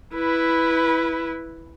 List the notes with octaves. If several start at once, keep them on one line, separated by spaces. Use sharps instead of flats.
E4 B4